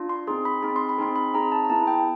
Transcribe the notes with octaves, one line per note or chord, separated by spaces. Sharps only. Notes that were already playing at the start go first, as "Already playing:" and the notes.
Already playing: D4 F4
C6
C4 D#4 G#4 C6
B5
C4 D#4 G#4 B5
C6
B5
C4 D#4 G#4 C6
B5
C4 D#4 G#4 A#5
A5
A#5
B3 E4 G#4 A5
G5